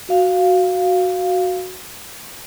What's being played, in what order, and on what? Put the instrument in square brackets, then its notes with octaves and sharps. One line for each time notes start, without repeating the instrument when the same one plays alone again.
[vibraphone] F#4 F5